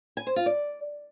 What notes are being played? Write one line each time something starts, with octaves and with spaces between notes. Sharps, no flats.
G#5
C5
F4
D5